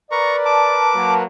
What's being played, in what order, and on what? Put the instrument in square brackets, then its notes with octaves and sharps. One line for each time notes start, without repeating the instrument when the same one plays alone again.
[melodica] A#4 B4 [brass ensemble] D5 [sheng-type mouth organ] A#5 C#6
[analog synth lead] A5 [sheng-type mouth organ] D6
[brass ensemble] F#3 A#3